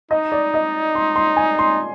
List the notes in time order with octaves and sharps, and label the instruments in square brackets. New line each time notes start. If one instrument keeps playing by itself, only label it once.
[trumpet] D#4 [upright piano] D#5
[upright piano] D5
D#5
C6
C6
G#5
C6